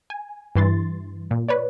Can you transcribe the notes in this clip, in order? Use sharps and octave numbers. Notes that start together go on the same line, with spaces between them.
G#5
G2 E3 C6 A6
A#2
B4 C#5 D5